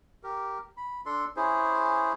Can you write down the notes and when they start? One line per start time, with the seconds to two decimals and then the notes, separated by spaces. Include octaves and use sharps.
0.23 G4 A#4
0.77 B5
1.06 D4 A4 C6
1.36 C#4 E4 G#4 C5